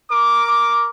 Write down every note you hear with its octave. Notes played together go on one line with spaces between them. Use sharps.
A#4 D6